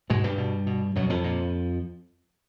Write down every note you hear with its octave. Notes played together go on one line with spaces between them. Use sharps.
G#2 B2 G#3
G2 G3
B2
B2
F#2 B2 F#3
F2 F3
A#2